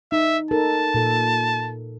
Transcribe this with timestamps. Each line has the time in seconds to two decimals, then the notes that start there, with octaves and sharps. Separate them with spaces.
0.12 D#4 E5
0.51 D#4 A4 A#4 A5
0.94 A#2 A4